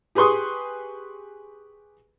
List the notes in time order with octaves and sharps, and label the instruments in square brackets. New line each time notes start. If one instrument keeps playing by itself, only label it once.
[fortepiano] G4 G#4 B4 C6 C#6 D#6